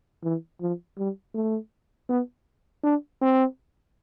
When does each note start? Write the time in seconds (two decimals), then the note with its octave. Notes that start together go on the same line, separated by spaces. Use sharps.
0.23 E3
0.61 F3
0.98 G3
1.34 A3
2.09 B3
2.83 D4
3.21 C4